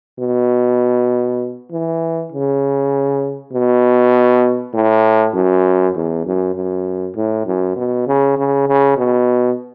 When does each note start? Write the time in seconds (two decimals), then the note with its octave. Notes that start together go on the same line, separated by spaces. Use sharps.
0.19 B2
1.71 E3
2.32 C#3
3.53 B2
4.74 A2
5.35 F#2
5.95 E2
6.26 F#2
6.55 F#2
7.16 A2
7.46 F#2
7.76 B2
8.07 C#3
8.37 C#3
8.67 C#3
8.97 B2